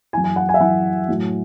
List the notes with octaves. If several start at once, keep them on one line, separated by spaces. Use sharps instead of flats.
F#2 E3 G#5
G#5
F#5
G#5
E5
F#2 E3 F#5
A2 F#3